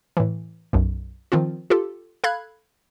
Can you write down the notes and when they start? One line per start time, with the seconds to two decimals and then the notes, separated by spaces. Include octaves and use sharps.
0.17 A2 E3
0.73 B1 F#2
1.32 D#3 F3 C4 F4
1.70 F4 G4 A4
2.24 A4 F5 B5 F#6 G#6